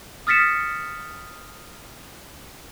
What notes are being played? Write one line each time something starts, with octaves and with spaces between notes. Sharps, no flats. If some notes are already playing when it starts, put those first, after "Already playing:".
D#6 F6 A6 B6 C#7 E7